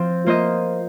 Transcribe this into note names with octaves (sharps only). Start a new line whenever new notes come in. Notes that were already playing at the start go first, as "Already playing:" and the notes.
Already playing: F3 C4 F4
A#3 F4 C5 D#5